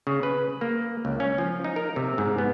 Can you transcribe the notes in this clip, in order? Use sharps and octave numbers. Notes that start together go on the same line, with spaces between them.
C#3
B4
A#3
C#2
C#4
F3
D#4
A#4
C3
G#2
B3